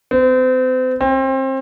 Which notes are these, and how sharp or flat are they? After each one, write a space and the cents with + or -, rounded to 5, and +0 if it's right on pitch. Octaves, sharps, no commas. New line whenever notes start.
C4 -35
C4 +30